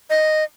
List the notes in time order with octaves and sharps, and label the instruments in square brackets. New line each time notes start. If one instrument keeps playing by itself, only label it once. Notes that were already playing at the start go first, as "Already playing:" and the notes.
[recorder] D#5